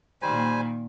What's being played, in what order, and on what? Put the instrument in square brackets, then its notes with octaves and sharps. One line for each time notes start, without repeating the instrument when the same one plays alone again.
[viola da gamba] A#2 D#3 [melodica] G3 C5 G#5